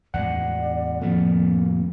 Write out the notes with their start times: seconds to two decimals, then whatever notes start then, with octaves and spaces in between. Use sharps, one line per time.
0.14 E2 A2 G#3 D5 F#5
1.01 F2 A2 D#3 A3 A#3